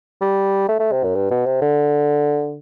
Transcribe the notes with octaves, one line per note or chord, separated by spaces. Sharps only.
G3
A3
A3
C3
F#2
G2
B2
C3
D3